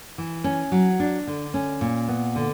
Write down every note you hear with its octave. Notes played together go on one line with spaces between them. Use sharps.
E3
C#4
F#3
D4
D3
C#4
A#2
B3
D3